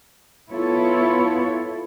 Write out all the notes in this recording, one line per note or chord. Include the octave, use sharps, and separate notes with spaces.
B3 E4 F4 A4 C#5